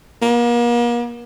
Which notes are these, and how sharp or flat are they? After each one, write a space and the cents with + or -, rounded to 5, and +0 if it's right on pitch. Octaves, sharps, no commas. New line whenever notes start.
A#3 +40